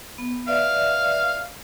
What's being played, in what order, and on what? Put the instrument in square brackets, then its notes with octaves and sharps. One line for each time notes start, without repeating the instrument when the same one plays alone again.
[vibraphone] B3
[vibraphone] B4 D5 E5 [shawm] F5